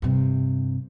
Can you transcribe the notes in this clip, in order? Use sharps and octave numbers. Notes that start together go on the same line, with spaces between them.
G2 C3